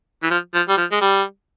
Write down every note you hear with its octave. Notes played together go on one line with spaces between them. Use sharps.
E3
F3
F3
G3
F3
G#3
G3